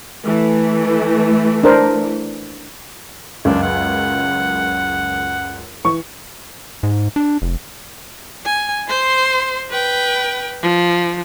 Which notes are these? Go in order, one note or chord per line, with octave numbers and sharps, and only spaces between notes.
E3 A3
D4 A#4 C5
C#2 F#2 D4
F#5
E3 C#6
G#2
D4
F1
G#5
C5 C6
B4 G5
F3